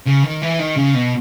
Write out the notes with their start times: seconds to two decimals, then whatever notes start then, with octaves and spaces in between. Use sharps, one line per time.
0.06 C#3
0.24 D#3
0.41 E3
0.59 D#3
0.77 C#3
0.94 B2